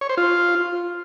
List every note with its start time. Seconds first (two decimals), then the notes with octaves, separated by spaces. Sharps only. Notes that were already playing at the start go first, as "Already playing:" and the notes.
0.01 C#5
0.09 C5
0.18 F4